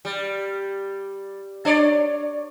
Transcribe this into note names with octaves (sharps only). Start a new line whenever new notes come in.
G3
D4 C#5 D5